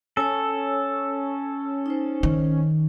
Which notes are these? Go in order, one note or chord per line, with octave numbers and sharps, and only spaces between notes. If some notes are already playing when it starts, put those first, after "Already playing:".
C#4 A4 C#5 G#5
D#4 C5
D#3